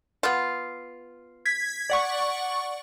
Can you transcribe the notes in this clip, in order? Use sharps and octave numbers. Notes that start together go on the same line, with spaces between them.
B3 F4
G#6 B6
D5 F#5 C#6